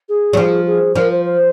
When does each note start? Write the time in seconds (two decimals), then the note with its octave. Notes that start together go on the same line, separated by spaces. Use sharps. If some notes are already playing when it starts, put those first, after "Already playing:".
0.09 G#4
0.33 F#3
0.37 F3
0.66 G#4
0.95 F3 A#4
1.10 C5
1.24 C5